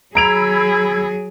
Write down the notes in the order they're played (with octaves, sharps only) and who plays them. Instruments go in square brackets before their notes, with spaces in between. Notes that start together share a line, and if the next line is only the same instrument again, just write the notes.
[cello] F#3 G#4 [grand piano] A#5 D7 F7 [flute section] B5 E6 G#6